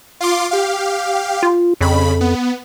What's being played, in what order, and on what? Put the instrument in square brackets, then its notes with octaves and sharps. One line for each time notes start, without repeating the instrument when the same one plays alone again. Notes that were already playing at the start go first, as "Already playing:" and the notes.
[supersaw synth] F4 C6 D6
G4 F5
[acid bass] F4
[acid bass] F2 [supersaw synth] C#3 B5
[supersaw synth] B3